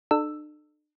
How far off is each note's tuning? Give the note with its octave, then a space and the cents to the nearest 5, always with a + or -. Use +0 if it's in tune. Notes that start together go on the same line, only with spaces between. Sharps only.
D4 +45 A4 -15 E6 +5